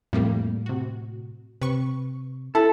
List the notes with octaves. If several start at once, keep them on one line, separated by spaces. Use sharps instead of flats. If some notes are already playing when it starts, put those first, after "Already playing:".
F2 A2 G3 A#3
C3 F#4
C3 B4 C#6
E4 A4